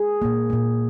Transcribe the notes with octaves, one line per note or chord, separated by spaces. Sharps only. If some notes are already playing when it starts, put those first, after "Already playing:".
Already playing: G#4
A#2 A#3
A#2 A#3